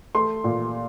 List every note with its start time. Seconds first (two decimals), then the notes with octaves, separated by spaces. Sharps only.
0.15 A3 C6
0.44 A#2